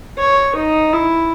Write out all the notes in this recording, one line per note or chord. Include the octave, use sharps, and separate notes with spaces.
C#5
D#4
E4